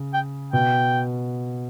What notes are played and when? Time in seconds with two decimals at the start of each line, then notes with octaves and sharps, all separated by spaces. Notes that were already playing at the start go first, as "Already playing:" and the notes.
Already playing: C#3
0.13 G5
0.53 B2 G5